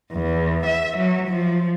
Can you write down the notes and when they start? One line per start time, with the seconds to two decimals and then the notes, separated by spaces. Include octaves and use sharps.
0.13 E2
0.66 E5
0.97 F#3
1.28 F3